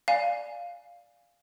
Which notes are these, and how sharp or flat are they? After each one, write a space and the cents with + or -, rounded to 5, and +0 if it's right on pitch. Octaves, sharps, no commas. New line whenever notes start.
D5 +0 F5 +0 G#5 +0